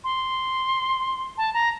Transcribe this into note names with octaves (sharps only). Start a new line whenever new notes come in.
C6
A5
A#5